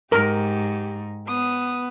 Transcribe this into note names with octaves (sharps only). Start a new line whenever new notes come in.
G#2 G4 A#4
B3 D#6